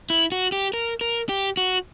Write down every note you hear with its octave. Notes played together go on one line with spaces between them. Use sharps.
E4
F#4
G4
A#4
A#4
G4
F#4